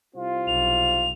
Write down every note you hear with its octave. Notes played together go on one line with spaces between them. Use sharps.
C2 C4 F4
B1 F7